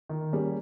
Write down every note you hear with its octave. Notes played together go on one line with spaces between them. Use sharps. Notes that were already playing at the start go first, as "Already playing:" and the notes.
D#3
G3 A#3 C#4 G#4